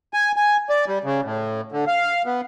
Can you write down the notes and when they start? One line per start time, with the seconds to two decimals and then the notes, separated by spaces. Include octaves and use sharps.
0.14 G#5
0.36 G#5
0.69 D5
0.88 G3
1.04 C#3
1.24 A2
1.72 D3
1.87 F5
2.26 B3